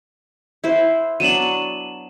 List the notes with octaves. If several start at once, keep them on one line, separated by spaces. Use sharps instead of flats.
E4 B4 C5
F#3 B3 D4 D#7 E7 F#7